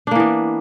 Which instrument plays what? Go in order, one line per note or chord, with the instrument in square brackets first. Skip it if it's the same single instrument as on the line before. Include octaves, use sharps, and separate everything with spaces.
[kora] D4
A#3
E3
B3